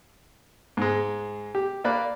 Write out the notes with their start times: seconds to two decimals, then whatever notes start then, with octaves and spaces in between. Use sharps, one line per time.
0.77 G#2 G#3
1.55 G4
1.84 A#3 D5 B5 F#6